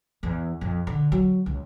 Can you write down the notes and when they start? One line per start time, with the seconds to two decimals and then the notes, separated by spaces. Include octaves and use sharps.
0.23 E2
0.61 F2
0.87 D3
1.12 F#3
1.46 C#2